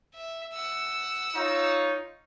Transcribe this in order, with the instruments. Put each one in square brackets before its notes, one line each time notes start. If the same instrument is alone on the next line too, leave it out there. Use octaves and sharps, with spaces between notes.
[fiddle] E5
F#5 E6
[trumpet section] D#4 F4 C#5